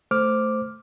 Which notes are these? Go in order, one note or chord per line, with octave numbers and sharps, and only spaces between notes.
A3 C5 D6 F6